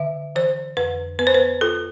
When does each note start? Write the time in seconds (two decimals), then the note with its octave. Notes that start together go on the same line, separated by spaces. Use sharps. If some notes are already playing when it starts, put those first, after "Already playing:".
Already playing: D3 E5
0.36 E3 C5
0.77 F2 B4
1.19 B3 B4
1.27 C5
1.34 B4
1.61 F4 A4